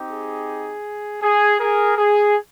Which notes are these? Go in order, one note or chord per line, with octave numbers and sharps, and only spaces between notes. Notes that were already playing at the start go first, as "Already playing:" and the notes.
Already playing: C4 D#4 G4
G#4
G#4
G#4 A#4
G#4